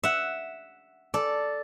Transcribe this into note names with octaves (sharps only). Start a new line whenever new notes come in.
E5 F#5
A4 D5